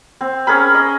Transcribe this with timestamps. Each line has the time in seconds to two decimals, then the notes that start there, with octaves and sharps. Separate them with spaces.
0.21 C4
0.47 C#4 G#4 A#4 B5
0.74 D#5